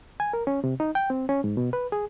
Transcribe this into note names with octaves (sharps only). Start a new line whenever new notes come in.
G#5
A#4
C#4
C3
D#4
G5
C4
C#4
G#2
B2
B4
G#4